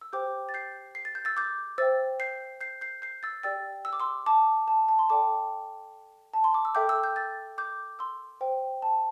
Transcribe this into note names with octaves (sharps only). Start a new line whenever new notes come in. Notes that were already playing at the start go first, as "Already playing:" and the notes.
E6
G4 C5 G5 D6 G6
A6
G6 C7
C7
A6
G6
E6 A6
D6 G6
C5 E5 G5 E6 A6
G6 C7
G6 C7
G6 C7
G6 C7
E6 A6
G4 D5 G5 E6 A6
E6
D6
C6 E6
A5 D6
A5
A5
C6
A4 D5 G5 A5 D6
A5
C6
D6
E6
A4 E5 G5 D6 G6
E6
G6
E6 A6
D6 G6
C6 E6
C5 G5
A5